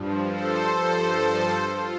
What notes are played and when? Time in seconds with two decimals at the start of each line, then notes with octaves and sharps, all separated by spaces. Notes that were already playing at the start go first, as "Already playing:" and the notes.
Already playing: G2 F3
0.28 A4 C5
0.75 G2 F3
1.68 F4